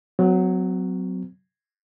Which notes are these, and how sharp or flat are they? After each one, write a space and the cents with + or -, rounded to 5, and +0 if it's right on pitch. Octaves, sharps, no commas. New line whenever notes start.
F#3 +0 C4 -40